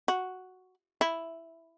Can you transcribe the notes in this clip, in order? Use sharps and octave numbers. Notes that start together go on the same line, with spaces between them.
F#4
E4